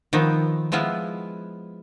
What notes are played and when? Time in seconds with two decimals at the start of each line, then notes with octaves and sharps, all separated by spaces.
0.13 D#3 F3 B3 C4
0.72 F3 G#3 B3 E4 F4